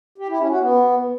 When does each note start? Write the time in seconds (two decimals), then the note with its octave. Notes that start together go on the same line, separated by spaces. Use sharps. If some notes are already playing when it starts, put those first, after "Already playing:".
0.18 G4
0.28 E4
0.39 C#4
0.50 F#4
0.60 B3